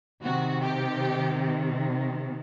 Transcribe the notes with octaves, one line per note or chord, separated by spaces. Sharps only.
C3 D#3 F#4
G4